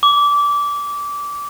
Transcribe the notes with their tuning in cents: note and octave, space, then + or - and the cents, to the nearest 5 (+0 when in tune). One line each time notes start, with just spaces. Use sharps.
D6 -20